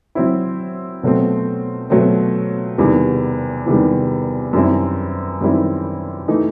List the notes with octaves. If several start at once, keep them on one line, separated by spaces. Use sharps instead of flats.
F#3 C4 E4
B2 F#3 A3 C4
B2 F#3 A3 C4
E2 C3 D#3 G3
E2 C3 D#3 G3
F#2 D#3 G3 C4 E4
F#2 D#3 G3 C4 E4
E3 A3 D#4